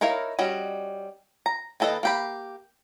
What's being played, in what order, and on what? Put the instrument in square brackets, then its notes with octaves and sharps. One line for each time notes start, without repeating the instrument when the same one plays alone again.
[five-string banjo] D#4 E4 A#4 C#5 F5
G3 C#4 F#4 D#5
A#5
D#3 A#3 A4 B4 D#5
A#3 G4 B5